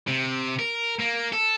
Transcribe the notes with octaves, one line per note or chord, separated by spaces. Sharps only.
C3
A#4
A#3
A4